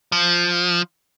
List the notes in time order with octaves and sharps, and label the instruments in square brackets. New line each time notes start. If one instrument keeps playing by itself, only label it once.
[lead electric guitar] F3